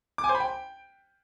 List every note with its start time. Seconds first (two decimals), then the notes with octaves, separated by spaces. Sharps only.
0.18 D6
0.24 G#5
0.29 C5
0.35 B5
0.40 G5